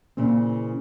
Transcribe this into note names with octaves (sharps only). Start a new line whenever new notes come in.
A#2 C#3 E3 C4